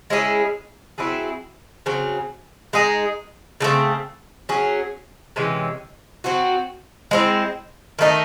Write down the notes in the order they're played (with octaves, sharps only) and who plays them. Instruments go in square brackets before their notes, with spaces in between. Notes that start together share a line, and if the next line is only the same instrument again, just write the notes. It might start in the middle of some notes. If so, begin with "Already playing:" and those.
[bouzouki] G#3 C#4 E4 G#4
F#3 C4 E4 G#4
C#3 F#3 C4
G#3 D#4 G#4
C#3 F#3 A3 C4
F#3 C#4 G#4
C3 E3 G#3 C#4
F#3 C4 F#4
G#3 C4 E4
D#3 A3 D#4